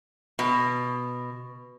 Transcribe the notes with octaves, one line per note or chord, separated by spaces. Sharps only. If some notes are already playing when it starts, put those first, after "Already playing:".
B2